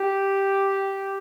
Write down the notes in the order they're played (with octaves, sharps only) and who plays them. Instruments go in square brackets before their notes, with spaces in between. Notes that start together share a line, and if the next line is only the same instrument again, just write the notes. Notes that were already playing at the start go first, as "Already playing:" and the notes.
Already playing: [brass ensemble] G4